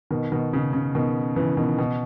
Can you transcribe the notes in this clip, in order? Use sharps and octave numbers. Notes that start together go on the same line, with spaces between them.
B2 D#3
B2 D#3
C#3
C#3
B2 D#3
C#3 E3
B2 D#3
B2